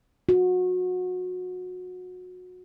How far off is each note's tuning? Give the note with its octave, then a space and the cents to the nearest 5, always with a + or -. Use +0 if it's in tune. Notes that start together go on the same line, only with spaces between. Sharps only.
F#4 -25